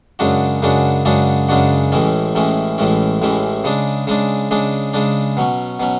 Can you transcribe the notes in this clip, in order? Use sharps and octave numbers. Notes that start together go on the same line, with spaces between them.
F#2 C#3 G#3 D4 F#4
F#2 C#3 G#3 D4 F#4
F#2 C#3 G#3 D4 F#4
F#2 C#3 G#3 D4 F#4
A1 A2 E3 G#3 C#4
A1 A2 E3 G#3 C#4
A1 A2 E3 G#3 C#4
A1 A2 E3 G#3 C#4
C#3 G#3 D4
C#3 G#3 D4
C#3 G#3 D4
C#3 G#3 D4
B2 F#3 C#4
B2 F#3 C#4